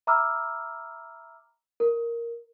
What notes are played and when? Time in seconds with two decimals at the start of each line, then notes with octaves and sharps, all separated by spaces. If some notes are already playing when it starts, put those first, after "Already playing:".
0.07 E5 A#5 B5 D6 E6 F6
1.80 A#4